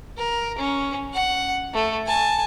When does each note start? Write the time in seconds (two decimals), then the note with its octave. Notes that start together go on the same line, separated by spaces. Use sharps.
0.17 A#4
0.58 C#4
1.14 F#5
1.74 A3
2.07 G#5 A5